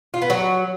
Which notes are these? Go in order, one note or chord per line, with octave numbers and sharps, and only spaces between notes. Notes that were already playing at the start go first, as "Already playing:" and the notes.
F4
B3
F#3